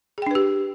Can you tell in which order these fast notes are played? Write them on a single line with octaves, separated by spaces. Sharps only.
G#4 G5 D4 B4 G4